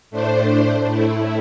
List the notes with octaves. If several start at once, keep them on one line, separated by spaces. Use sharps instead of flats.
A2 A3 D4 C5
A2 A3 E4